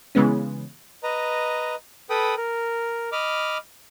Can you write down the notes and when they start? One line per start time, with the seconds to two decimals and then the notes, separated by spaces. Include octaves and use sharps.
0.15 C#3 E3 G#3 B3 C#4
1.03 B4 D#5 A#5
2.10 A4 B4 G5 B5 D#6
2.37 A#4
3.12 D#5 B5 D6 F6